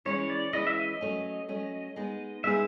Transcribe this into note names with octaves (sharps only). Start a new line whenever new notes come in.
E3 G#3 C#4 E4 C#5
D5
E3 G#3 C#4 E4 D#5
E5
D#5
F#3 A3 C#4
F#3 A3 C#4
G#3 B3 D#4 G#4
G#3 B3 D#4 G#4 E5